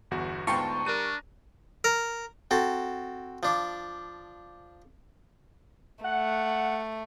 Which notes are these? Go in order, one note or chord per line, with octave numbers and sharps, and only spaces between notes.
G1 E2 F#4
D2 G#2 B3 F4 G5 A5 A#5 C#6
G3 D4 A#4 D#7
A#4
C4 F#4 A4
F3 D4
A3 F#5